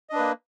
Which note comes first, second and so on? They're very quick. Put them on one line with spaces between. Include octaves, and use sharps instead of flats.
D#5 D4 B4 A#3